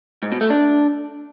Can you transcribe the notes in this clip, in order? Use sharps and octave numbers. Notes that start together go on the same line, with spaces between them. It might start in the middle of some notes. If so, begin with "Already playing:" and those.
G#2
B2
A3
D4